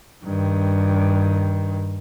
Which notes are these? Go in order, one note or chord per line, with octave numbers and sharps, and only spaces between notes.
G2 D#3